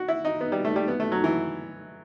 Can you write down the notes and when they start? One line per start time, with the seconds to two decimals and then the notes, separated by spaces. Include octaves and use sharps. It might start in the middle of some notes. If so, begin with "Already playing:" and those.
Already playing: F#4
0.08 E4
0.25 D#4
0.41 B3
0.52 G3
0.65 A3
0.76 G3
0.88 B3
1.00 A3
1.12 F#3
1.24 E3